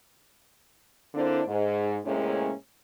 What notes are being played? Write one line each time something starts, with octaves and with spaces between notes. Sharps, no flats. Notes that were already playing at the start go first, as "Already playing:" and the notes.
D3 A#3 C4 D4 E4 C5
G#2
A2 C3 G#3 A#3 C#4